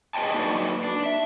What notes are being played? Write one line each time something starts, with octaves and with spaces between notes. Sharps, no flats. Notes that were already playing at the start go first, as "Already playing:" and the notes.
G#4 B4 C#5 D#5 G5 A5
F#3 A#3 D#4 F#4 B4 D5
D4
E5